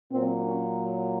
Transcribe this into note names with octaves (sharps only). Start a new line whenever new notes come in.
A#2 F#3 C4
C#4